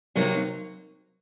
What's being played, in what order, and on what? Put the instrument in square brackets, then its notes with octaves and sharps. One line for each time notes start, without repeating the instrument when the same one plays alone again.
[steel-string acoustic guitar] C3 F#3 A#3 D#4